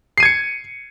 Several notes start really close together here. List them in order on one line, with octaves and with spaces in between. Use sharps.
C7 D#7 G#6 C#7